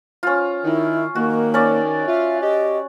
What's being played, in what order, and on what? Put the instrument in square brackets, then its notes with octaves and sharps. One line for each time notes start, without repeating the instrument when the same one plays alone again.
[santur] C#4 F4
[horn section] D#3 [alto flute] E4
[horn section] D#3 [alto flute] A#3 [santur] F#4
[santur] C#4 D5
[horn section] F4 [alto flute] E5
[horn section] G4 [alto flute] D#5